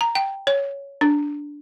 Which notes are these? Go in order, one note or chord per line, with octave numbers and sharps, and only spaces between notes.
A#5
G5
C#5
D4